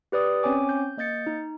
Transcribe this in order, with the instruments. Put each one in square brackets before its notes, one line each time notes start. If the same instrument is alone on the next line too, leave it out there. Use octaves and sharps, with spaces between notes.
[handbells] G4 B4 D5 D#6
C4 C#4 C#5 G#5 D6
G6
A#3 D#5 G6 A6 C#7
D#4